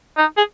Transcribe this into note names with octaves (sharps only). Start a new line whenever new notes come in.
D#4
G#4